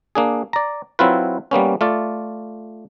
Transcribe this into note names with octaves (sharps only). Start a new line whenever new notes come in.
A#3 D4 G#4
D5 A#5
F#3 C4 E4 F4 B4
G3 A#3 B3 C#4
A3 F4 D5